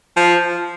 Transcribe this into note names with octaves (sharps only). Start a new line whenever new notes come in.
F3